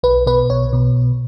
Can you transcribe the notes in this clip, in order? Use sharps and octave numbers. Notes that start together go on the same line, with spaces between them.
B1 B4
B2 B4
B1 C#5
B2